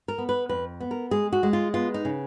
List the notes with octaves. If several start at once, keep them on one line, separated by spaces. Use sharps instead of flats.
A#4
B3
B4
F2 B4
B3
A#4
G#3 G#4
F#4
G#3
F4
B3 F4
D#4
C#3